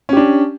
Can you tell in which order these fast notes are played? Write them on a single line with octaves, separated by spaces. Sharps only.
C#4 G4 D4